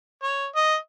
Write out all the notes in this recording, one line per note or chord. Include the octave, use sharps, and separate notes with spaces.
C#5
D#5